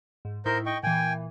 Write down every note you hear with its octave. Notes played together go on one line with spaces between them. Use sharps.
G#2
A2 D#4 E4 A#4 C5 G6
D#5 G5 C#6
A#2 E3 G5 G#5